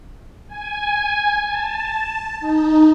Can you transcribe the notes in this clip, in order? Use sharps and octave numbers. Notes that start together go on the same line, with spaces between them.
G#5
A5
D#4